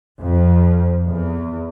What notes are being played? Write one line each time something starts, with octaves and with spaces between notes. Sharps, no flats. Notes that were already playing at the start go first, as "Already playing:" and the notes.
F2
E2